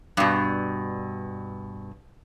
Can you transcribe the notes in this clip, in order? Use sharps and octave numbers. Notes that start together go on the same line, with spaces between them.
G2 B2